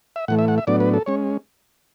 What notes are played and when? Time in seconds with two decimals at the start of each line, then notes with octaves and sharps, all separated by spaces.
0.16 E5
0.28 A2 E3 A3 F#5
0.39 E5
0.48 F#5
0.58 E5
0.67 A2 F#3 B3 D4 D5
0.80 B4
0.94 A4
1.06 G#3 C#4 C#5